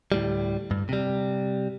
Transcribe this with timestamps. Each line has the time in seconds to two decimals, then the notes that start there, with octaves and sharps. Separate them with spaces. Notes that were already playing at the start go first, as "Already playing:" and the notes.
0.12 D2 A2 G3
0.71 G2
0.89 C3 G3